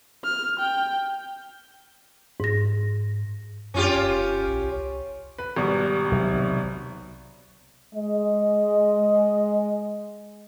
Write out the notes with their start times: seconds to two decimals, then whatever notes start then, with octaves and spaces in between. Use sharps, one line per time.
0.24 F6
0.59 G5
2.40 G#2 A#6
3.74 F#2 C#4 F4 G4
3.95 F1
4.46 A#1
4.61 C2
5.39 B4
5.57 G#1 B2 G3
6.11 B1 C3
7.94 G#3 D#5